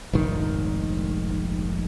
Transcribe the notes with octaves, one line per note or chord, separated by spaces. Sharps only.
F1 A#1 G#2 D#3